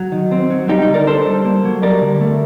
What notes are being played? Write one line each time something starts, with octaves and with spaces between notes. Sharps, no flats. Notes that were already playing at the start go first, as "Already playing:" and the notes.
Already playing: F#3
D#3
C4
F#3
G3 D#4 G4
D#4
D3
A#4 D5
D4 A4 C5
G3
A#3
F#3
G3 A#4 D5
D3
A3